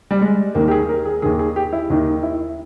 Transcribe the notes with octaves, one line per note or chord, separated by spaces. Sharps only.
G3
G#3
D#2 D#3 A#3
G4
G#4
A#4
G#4
D#2 D#3 G#4
G#4
G4
E4
D#2 D#3 D#4
E4